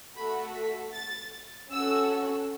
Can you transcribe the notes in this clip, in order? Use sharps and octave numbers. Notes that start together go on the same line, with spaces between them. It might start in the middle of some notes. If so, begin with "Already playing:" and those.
A3 F#4 A4 B5
B6
A6
C#4 F#4 A4 E6